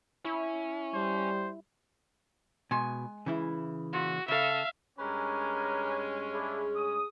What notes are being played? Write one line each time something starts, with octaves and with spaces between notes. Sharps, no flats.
C#4 E4
G3 C5
B2 G#3 G#5
C#3 E3 E4
A#2 F#4
C#3 A4 E5 F5
G2 G#3 C#4 G4 A#4 B4
D4 E4 G#4
D#6